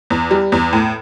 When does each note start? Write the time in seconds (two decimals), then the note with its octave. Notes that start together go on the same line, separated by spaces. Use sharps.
0.10 E2
0.31 G3
0.52 E2
0.73 A2